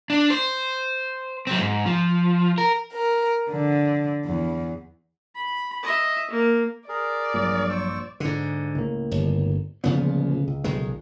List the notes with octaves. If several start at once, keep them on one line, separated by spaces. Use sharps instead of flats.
D4
C5
F#3 C4
G#2
F3
A#4
A#4
D3
E2
B5
D#5 E5
A#3
G#4 A#4 D5
A#1 G2 A#2 F#3
C5 C#6 E6
G#2 D3
C#2 A2 A#3
G1
D1 A#2 C#3 F3 B3
C#2
B1 D#3 G#3